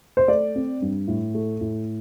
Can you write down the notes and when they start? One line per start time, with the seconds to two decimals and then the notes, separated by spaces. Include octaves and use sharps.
0.17 C5
0.28 A3 D5
0.56 C4
0.82 G2
1.07 A2
1.34 A3
1.61 A2